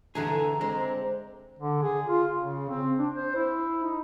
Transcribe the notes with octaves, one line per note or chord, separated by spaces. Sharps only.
D3 E3 G#4 A4 E5 A5 A#5
G#3 C4 D4
D3
G#4
F4
C#3
C4
D4
C5
E4
D#4